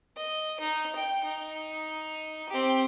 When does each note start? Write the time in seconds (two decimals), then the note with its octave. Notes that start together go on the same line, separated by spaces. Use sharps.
0.17 D#5
0.60 D#4
0.96 G5
1.24 D#4
2.49 C4 G4